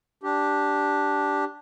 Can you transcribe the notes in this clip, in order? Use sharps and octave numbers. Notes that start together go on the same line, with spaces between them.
D4 G4